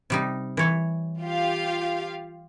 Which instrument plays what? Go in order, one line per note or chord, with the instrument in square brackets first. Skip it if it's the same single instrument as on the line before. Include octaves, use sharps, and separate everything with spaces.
[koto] C3 G3 D#4
E3 C#5
[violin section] F4 G4 F5